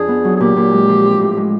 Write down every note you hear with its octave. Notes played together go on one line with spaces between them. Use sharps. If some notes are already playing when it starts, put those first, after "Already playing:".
Already playing: F2 D4 G#4
B3
F#3
G#4
A#2 G4
A#2
G#3
F3
C4
A2
G#3